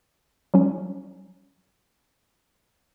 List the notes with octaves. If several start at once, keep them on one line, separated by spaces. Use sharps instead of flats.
F#3 G3 C#4